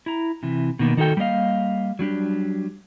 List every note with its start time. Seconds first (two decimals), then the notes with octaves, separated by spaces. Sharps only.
0.06 E4 A#5
0.43 C3 E3
0.79 B2 D#3 A#3
0.97 D#3 D#4 F#4 A4 G5
1.17 G3 A3 A#3 D#5 F5
1.99 F#3 G3 D4 G4